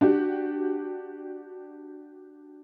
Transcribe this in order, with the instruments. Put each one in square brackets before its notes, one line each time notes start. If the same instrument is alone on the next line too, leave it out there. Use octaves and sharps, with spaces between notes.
[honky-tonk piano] D4 F#4 G4